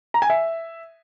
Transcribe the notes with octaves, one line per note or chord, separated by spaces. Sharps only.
A#5
G#5
E5